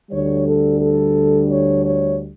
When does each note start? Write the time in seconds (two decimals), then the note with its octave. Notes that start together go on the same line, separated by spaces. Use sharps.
0.11 D2 D3 G3 C#5
0.45 A4
0.81 A4
1.50 C#5
1.85 C#5